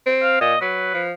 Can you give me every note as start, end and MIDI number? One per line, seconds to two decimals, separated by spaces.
0.07 0.40 60
0.22 0.38 77
0.41 0.55 46
0.41 0.60 75
0.61 0.91 54
0.61 1.02 71
0.94 1.12 53